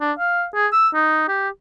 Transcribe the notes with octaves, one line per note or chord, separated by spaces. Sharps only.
D4
F5
G#4
E6
D#4
G4